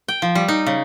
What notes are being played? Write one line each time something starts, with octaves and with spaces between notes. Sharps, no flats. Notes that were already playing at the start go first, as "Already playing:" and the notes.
G5
F3
G3
D#4
C#3